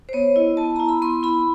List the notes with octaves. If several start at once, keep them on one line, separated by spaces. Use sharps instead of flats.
C5
B3 C#5
E4 D#5
B3 A5
E4 A#5
B5
B3 C6
E4 B5